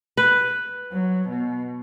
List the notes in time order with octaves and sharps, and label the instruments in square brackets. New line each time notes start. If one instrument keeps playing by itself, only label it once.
[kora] B4
[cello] F#3
B2